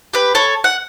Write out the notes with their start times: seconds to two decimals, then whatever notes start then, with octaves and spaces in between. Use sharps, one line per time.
0.14 G4 B4
0.35 A4 C#5
0.64 F#5